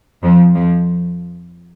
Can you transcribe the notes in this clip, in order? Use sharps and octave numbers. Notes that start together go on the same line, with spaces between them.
F2 F3
F2 F3